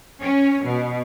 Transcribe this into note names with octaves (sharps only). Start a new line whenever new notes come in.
C#4
B2